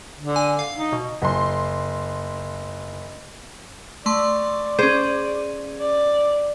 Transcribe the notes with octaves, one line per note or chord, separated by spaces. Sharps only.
D3
G#5
F5
D#4
B2
F#1 C6
A3 D5 C6 C#6
C#4 G#4 C5
D5